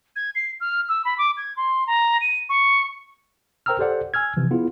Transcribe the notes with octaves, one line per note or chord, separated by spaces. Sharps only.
G#6
C7
F6
E6
B5
D6
G#6
C6
A#5
D#7
C#6
A#4 C5 G5 A#5 E6 F6
G4 A4 C5 D5 F#5
G#5 E6 F6 G#6
C3 E3 F3
B3 E4 F4 G#4